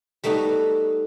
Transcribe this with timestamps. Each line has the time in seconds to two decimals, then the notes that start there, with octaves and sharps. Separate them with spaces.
0.24 G3 A3 B3 D#4 F#4